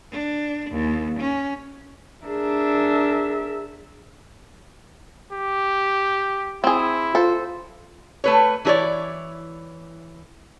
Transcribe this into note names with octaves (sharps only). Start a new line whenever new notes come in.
D4
D#2
C#4
D4 G#4 A#4 E5
G4
C4 E4 G#4
F4 A4 C5
A3 B4 C#5
E3 E4 G#4 C#5 D5